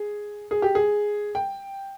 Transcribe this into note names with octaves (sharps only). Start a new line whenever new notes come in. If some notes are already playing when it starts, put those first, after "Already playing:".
Already playing: G#4
G#4
G4
G#4
G5